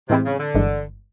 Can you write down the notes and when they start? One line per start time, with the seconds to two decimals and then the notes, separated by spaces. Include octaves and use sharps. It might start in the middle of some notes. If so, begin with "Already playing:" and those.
0.09 A2 C3 E3 G#3 C4 E4
0.25 C#3
0.40 D3
0.55 G1 G2 E3 G#3